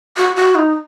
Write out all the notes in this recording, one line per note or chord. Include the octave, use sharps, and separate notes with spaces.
F#4
F#4
D#4